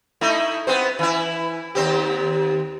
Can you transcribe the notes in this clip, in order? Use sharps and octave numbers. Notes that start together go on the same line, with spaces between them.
A3 D#4 E4
B3 C4 C5
E3 E4
D#2 C4 G4